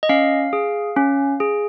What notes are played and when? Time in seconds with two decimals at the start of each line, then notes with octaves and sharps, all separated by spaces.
0.03 D#5
0.09 C#4 F5
0.53 G#4
0.97 C#4
1.40 G#4